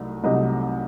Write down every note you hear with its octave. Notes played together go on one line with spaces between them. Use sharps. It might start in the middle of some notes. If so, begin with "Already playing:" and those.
Already playing: C2 F#3 A3 D#4
C2 C3 F#3 A3 D#4 D#5